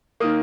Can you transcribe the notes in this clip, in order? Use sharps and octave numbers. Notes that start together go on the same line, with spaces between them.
D#3 A#3 D#6